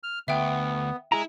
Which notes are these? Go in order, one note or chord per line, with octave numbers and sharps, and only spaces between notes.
F6
D2 B3 E5 G5
G#3 E4 G#4 A#5